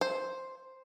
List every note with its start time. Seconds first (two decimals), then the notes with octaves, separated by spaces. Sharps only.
0.01 C5